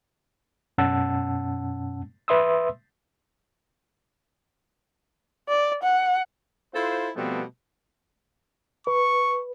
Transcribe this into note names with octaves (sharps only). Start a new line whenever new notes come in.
F#2 B2 C#4 F#5 A5 E6
B4 E5 C6 D#6 E6
D5
F#5
E4 F4 A4 C5
B2 F3 G3 A3 B3 C4
B4 C#6